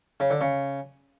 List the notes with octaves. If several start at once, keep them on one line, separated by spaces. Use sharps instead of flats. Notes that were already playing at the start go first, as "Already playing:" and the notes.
C#3
D3
C#3